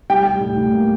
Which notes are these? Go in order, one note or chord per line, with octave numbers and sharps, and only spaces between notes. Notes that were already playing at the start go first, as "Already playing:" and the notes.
G3 G5
G3
A2
A2
A#3